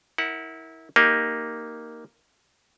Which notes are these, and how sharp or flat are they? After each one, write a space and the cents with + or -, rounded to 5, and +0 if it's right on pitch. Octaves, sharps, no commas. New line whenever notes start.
E4 -25 A#4 +0 F#5 +0
A#3 +0 D#4 +0 G4 +0